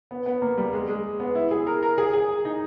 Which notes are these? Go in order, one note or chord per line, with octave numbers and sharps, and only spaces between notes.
B3
B3
A#3
G3
G#3
G#3
B3
E4
G#4
A#4
A#4
G#4
G#4
D#4